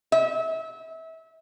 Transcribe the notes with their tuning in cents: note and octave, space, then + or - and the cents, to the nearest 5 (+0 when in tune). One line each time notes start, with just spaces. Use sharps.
E5 -25